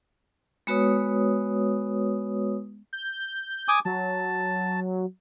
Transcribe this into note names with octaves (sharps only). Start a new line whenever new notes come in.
G#3 B3 F#4 B4 C#5 D#6
G6
G#5 D6 D#6
F#3 A5